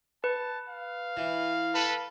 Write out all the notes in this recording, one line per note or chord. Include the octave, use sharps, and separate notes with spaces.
B4 A5
F5
E3
A4 B4